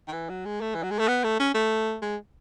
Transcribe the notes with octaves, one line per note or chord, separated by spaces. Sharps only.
D#3
E3
F#3
G#3
A3
E3
F#3
G#3
A3
B3
A3
C#4
A3
G#3